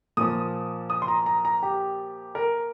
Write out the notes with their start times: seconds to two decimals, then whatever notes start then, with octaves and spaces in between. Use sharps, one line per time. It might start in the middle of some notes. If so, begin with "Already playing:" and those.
0.17 A#2 F3 D#6
0.90 D#6
1.02 C6
1.08 A#5
1.26 A#5
1.45 A#5
1.62 G4
2.35 A#4